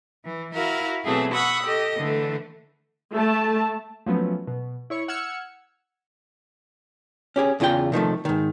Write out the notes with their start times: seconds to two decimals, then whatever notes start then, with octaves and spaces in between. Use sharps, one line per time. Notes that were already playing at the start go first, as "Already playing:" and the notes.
0.25 E3
0.54 E4 F#4 A#4 F5
1.04 B2 E3 F#3 A3 C4 G#4
1.34 F#5 B5 C#6 D#6 E6
1.64 G4 A4 D#5
1.98 D3 E3 A3
3.14 A3 A5
4.06 F3 F#3 A3 B3 C#4
4.47 B2
4.90 E4 C#5 C#6
5.08 F#5 E6 F6 G#6 C#7
7.36 C#4 G4 G#4
7.60 E2 C#3 F4 G4 G5
7.92 C3 D#3 F3 A3
8.25 G#2 D#3